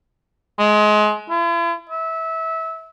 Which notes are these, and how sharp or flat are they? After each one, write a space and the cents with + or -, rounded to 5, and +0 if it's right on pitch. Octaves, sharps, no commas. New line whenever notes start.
G#3 +25
E4 +45
E5 -20